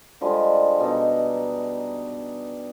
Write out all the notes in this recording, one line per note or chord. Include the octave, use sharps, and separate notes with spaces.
D3 F3 G3 G#3
B2 D4 D#4